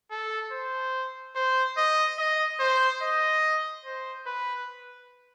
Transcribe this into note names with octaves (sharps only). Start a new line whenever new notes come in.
A4
C5
C5
D#5
D#5
C5
D#5
C5
B4